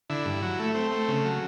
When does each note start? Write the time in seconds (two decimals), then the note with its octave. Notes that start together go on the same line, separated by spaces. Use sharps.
0.10 D3 E4
0.25 G2
0.42 F#3
0.59 A3
0.75 C4
0.91 A3
1.08 C#3
1.25 F#3